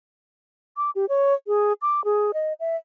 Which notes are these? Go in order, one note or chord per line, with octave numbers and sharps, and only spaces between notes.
D6
G4
C#5
G#4
D6
G#4
D#5
E5